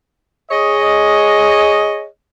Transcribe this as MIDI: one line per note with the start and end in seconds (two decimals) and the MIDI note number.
0.51 2.05 68
0.51 2.05 73
0.51 2.05 75